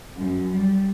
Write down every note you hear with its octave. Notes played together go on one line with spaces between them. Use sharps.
F#2
G3